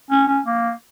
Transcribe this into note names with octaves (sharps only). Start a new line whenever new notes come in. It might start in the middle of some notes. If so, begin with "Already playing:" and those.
C#4
C#4
A#3